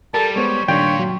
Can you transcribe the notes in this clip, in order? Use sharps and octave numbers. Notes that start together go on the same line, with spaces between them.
G3 A4 A#4 A5
G#3 B3 C5 C#5
A#2 D#3 G3 D4 F4 C#5 G5
F#3